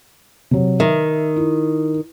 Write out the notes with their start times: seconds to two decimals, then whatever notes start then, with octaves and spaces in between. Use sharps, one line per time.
0.51 C3 F#3
0.80 D#3 E5
1.36 E4